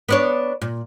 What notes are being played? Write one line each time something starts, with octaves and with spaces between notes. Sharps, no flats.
B3 D4 C#5
A#2